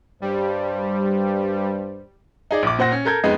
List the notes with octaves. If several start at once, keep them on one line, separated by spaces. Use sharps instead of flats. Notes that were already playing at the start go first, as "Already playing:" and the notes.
G2 G3 C5
D#4 G#4 D5
A#1 D6
A#2 C5 F#5 A#6
C#4
A4 A#4 G6 G#6
F2 G#3 B3 D#4